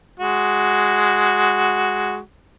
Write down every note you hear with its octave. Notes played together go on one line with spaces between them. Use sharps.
G#3 F#4